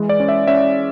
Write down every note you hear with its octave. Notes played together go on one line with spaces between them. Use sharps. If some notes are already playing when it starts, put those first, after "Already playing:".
Already playing: E3 G#3
D5
C#4
E5
C#4 E5